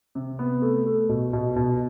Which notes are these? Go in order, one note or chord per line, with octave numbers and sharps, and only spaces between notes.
C3
B3
A3
A3
B2
B2
B2